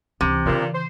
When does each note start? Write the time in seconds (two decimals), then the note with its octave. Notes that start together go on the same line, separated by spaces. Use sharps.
0.21 C#2 C3 E3
0.45 G2 A#2 C#3 E3
0.74 C5